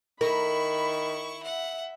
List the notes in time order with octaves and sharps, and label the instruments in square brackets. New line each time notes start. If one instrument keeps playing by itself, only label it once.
[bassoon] D#3 [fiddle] E4 C#6 [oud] A#4 [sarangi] B5
[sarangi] E5 [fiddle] F#5